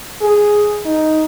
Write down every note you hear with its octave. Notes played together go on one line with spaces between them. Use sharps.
G#4
D#4